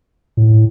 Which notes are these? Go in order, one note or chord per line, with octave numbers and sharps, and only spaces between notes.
A2